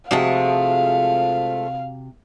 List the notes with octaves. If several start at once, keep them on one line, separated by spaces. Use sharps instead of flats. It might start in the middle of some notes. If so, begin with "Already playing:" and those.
C3 F3 G#3 A3 F#4 F5